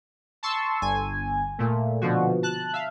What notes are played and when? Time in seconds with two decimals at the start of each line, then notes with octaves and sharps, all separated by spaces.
0.43 A5 C6 C#6 E6
0.81 G1 G#5
1.59 A#2 A3
2.01 B2 D3 F3 F#4
2.43 A5 F#6
2.73 E5 F5